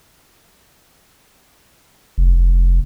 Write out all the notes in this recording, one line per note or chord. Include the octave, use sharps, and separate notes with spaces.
F1